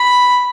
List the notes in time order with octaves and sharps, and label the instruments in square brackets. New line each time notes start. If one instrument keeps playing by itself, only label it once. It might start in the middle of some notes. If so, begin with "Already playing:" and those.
Already playing: [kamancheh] B5